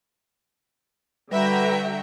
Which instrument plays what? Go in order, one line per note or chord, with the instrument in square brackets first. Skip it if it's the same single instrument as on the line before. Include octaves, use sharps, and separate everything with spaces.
[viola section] D3 G5 [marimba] G3 [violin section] F#4 E5 A#5 [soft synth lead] B4